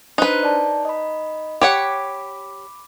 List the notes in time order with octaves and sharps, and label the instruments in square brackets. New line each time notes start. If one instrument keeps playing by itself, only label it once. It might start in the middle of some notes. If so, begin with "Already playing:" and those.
[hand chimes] D4 C5 F#6 [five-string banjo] D#4 B4
[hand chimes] D5 A5 A#5
D#5 B5
[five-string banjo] G4 C#5 F#5 [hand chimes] B5 D6